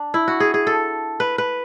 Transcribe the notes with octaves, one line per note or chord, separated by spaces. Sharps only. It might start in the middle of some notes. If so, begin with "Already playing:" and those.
Already playing: D4
E4
F#4
G#4
G#4
A4
B4
B4